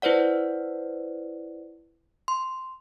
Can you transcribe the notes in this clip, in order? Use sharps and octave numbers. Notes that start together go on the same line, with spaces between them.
E4 B4 C5 D5 F#5
C6